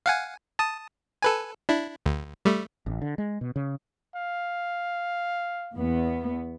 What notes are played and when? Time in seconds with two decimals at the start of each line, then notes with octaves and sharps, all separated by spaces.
0.06 F5 F#5 G#5
0.59 A5 D#6
1.22 A4 B4 G#5
1.69 D4 E4
2.06 D2
2.45 G3 A3
2.86 A1
3.02 D3
3.18 G#3
3.41 B2
3.56 C#3
4.15 F5
5.75 E2 B3